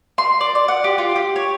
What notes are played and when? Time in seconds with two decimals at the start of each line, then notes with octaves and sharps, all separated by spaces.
0.18 C6
0.41 D5
0.55 D5
0.68 F#5
0.84 G4
0.98 F4
1.16 G4
1.36 C#5